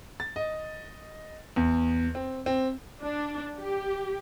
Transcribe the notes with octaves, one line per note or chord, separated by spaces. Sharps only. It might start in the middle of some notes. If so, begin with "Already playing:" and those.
A6
D#5
E2
C4
C4
D4
G4